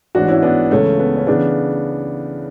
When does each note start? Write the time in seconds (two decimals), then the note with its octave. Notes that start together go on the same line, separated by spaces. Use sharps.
0.15 A1 G#2 E3 D4 F#4
0.28 C#4 E4
0.43 B3 D4
0.71 C#2 C#3 E3 A3 C#4
0.99 B3
1.17 C#4
1.27 C#3 E3 B3 D4